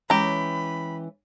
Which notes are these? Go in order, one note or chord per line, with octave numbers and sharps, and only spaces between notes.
E3 G#3 C#4 G4 A#5 B5